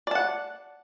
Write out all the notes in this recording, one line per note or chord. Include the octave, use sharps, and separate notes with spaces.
D5 F#5 A5